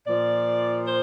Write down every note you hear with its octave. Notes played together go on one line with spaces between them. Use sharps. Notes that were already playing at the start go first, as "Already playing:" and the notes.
A#2 F3 D5
C5